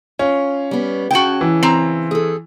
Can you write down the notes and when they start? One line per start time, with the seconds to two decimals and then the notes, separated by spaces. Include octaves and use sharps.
0.19 C#4 F4
0.71 G3 B3
1.11 C#3 C#4 F#4 G5 A5
1.41 E3
1.63 C4 A#5
2.11 G#4 A4